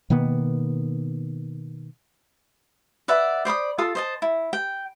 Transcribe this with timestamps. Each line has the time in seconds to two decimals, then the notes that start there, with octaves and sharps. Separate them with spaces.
0.10 B2 D#3 A#3 B3
3.08 B4 D5 E5 F#5
3.45 C5 D5 B5 D#6
3.78 F4 A4 D#6
3.95 C5 D#5 A5
4.22 E4
4.53 G5